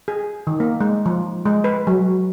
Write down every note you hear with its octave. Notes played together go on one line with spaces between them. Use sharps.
G#4
D#3
A#3
G#3
F3
G#3
B4
F#3